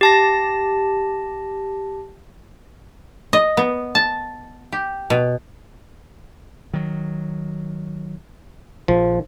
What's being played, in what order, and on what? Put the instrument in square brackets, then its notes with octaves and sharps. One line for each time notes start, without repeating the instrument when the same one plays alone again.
[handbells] G4 A5 A#6
[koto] D#5
B3
A5
G4
B2
[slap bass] D#3 F#3
[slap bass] A#1 [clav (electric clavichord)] F3